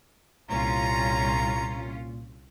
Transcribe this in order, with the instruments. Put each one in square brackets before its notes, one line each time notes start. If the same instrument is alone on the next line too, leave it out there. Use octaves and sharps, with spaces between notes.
[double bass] C2 [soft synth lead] A#2 [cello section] C#4 F4 [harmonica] A#5